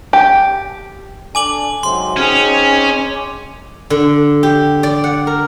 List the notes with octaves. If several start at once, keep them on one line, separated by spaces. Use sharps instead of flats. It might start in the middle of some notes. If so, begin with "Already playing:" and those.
G4
D4 A4 G#5 D6 F#7
G#2 C3 F#3 C6
C4 C#4 D#4 G#4
D3
G4
D5
F#5
A#4